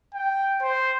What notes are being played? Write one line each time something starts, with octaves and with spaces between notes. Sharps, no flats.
G5
C5